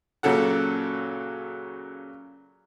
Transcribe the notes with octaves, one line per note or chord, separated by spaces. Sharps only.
A#2 C#3 F#3 A4 F#5